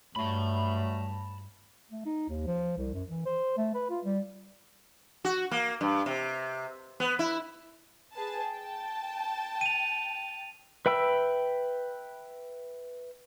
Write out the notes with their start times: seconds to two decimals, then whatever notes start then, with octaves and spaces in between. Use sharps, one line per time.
0.16 G2 F#3 G3 A3 A5 B5
1.91 A3
2.06 D#4
2.29 D#2
2.47 F3
2.78 C2
2.94 F#2
3.09 E3
3.26 C5
3.58 A3
3.75 B4
3.90 F4
4.05 G3
5.25 F#4
5.51 A#3
5.81 G2
6.06 C3
7.00 B3
7.19 E4
8.15 G#4 B4 A5
8.48 G5 A5
9.61 D#7 F7
10.86 B4 E5 G5 B5 E6